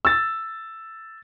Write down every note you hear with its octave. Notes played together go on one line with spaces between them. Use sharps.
E6 A6